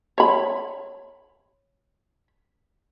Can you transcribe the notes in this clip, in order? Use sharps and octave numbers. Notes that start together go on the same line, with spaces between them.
C#5 B5